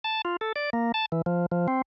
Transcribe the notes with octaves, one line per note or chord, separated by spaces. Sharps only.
A5
F4
A4
D5
A#3
A5
E3
F3
F3
C4